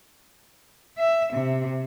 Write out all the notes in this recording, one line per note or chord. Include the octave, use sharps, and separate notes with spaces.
E5
C3